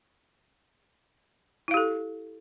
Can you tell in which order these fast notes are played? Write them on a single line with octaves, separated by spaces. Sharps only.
E4 F5 G4 A4